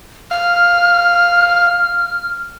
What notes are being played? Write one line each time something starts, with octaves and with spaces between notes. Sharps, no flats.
F5 F6